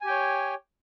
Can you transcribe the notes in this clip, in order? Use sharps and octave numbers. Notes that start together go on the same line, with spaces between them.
G4 C#5 G5 G#5